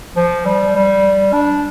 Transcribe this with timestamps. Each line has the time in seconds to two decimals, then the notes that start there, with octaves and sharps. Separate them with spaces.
0.17 F3
0.45 G3
0.75 G3
1.33 D4